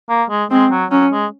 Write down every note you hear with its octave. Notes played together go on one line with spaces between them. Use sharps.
A#3
G#3
G#3 C4
F#3
F#3 C#4
G#3